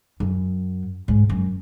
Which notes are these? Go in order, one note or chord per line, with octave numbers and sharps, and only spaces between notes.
F#2
G#2
F#2